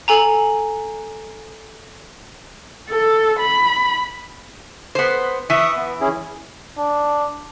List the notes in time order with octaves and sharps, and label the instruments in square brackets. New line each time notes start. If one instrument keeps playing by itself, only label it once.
[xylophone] A4 G#5 A#5
[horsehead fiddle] A4
B5
[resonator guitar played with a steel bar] B3 C5
[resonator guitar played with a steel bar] E3 [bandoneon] E5 C#6 D#6
[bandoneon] B3
C#4 E4 G#4
[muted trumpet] D4